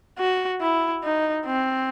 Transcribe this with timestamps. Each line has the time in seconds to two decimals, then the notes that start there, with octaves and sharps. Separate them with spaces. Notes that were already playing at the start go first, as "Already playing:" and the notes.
0.19 F#4
0.61 E4
1.03 D#4
1.46 C4